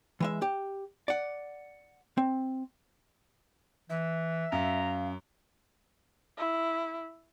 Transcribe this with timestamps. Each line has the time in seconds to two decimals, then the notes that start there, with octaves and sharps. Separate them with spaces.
0.20 E3 G#3 E5
0.42 G4
1.08 D5 F#5
2.18 C4
3.90 E3 E5
4.52 F#2 F5 A#5
6.38 E4